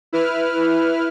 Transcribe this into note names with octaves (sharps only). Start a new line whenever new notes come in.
E4 B4 F6